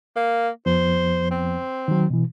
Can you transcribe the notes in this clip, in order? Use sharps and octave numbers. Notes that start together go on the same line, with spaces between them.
A#3
F2 F3 B3 C5
C4
D#3 F#3
B2 E3